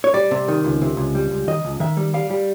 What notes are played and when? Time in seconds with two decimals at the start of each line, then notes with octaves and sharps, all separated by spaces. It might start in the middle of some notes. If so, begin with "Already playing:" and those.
0.04 C#5
0.14 G3 D5
0.31 C3
0.48 D#3
0.64 C#2
0.81 C3
0.97 C#2
1.15 G3
1.31 C#2
1.47 D#3 D#5
1.65 C#2
1.80 D#3 E5
1.97 G3
2.14 G3 F5
2.30 G3